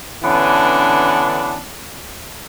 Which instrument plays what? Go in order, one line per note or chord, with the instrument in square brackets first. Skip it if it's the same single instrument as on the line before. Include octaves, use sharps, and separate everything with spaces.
[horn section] D3 E3 B3 C#4 D4